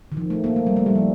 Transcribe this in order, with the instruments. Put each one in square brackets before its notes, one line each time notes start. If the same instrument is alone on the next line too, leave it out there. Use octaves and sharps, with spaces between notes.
[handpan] D#3
F3
A3
A#3
A3
G3
A3
G3
F3